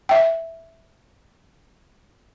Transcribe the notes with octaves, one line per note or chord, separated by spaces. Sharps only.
E5 G5